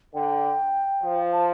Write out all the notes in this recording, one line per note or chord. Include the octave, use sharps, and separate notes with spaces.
D3 G5
F3
A5